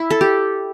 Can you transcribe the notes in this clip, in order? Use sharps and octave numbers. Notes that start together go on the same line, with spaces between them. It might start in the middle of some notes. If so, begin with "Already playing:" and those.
Already playing: E4
A4
G4